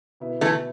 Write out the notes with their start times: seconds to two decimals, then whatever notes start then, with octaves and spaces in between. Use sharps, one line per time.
0.20 B2 B3 E4 B4
0.41 E3 A3